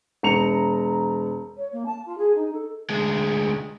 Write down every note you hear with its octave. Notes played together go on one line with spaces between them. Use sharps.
E1 A#5 C#7 F7
C#5
A#3
A5
F4
G#4
D#4
A4
D2 G#3